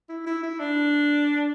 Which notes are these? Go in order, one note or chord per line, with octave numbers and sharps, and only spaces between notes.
E4
E4
E4
D4